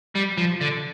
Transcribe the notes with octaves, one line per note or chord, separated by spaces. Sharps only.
G3
F3
D3